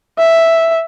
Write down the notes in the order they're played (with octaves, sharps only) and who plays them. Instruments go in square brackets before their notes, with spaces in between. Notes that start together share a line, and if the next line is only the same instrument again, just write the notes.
[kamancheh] E5